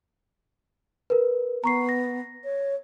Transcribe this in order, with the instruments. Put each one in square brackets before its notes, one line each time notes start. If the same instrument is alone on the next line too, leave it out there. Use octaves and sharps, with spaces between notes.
[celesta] A#4 B4
[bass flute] B3 [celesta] A#5 C#6 C7
[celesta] A#6
[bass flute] C#5